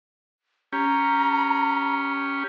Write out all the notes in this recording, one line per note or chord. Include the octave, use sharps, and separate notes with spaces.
C#4 G4 A#5